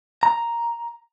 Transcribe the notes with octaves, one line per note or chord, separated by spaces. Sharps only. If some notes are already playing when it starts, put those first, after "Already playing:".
A#5